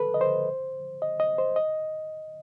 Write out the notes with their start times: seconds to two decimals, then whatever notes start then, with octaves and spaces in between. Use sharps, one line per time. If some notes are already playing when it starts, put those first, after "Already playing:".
Already playing: A4 B4
0.14 D#5
0.21 C5
1.02 D#5
1.20 D#5
1.38 C5
1.56 D#5